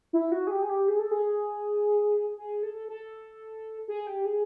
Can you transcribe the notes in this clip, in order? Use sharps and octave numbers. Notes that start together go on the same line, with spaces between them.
E4
F#4
G#4
G4
G#4
G4
G#4
A4
G#4
G#4
A4
A4
G#4
G4
G#4